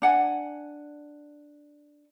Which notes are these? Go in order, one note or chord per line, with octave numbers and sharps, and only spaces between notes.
D4 F#5 G#5